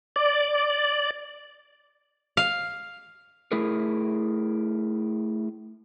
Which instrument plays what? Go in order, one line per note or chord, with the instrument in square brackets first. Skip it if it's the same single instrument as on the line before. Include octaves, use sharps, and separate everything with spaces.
[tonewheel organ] D5
[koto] F5
[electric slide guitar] A3 E4 G#4 A#4